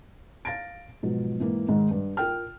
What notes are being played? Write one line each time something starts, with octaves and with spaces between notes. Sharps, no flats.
F5 A6 A#6 D7
G#2 B2 F3 F#3
G#2 E3 A#3
G#2 D#3 G#3
G2
F4 A#4 G5 F6